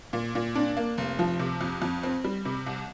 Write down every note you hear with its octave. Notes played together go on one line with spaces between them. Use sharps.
A#2
A#2
D4
A#3
F1
F3
C3
F2
F2
C4
G3
C3
C2